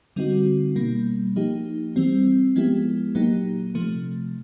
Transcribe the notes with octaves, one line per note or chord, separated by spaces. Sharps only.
D3 G3 C4 D#4 F#4
B2 G3 A#3
F3 A#3 D#4 G4
E3 G3 C4
F3 G#3 B3 E4 G4
A#2 F#3 A#3 D#4 G4
C3 F3 A3